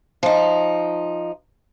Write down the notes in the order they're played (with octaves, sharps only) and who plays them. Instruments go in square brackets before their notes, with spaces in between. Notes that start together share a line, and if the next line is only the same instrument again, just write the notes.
[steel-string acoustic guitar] F3 D#4